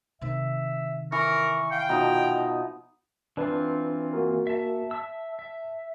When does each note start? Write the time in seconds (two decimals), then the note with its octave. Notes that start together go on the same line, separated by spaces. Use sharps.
0.21 C3 D#3 E5
1.12 E3 A#4 C#6
1.71 F5 G5
1.89 B2 F3 D#4 A#5
3.37 E3 C4 D4 F4 B4
4.13 A#3 F#4 A#4
4.47 E5 A5
4.91 E5 A5 E6
5.39 E5